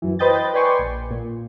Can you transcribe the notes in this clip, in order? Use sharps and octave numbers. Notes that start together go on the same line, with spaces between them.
F#2 E3
B4 C5 D#5 G5 G6 A6
B4 D5 G5 G#5 C6 C#6
A#1
A#2